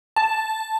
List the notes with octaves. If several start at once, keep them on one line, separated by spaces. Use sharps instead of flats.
A5